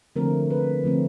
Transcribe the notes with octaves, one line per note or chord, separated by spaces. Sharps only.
D3 F3 A3 C4 A#4
B4
D3 F3 A3 C4